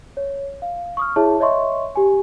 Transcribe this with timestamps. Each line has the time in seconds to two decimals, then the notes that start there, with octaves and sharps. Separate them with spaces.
0.17 C#5
0.62 F5
0.97 C#6 D#6 F6
1.16 E4 G#4 C#5 E5 A5
1.40 C#5 D#5 E5 C6 C#6
1.95 G4 G#5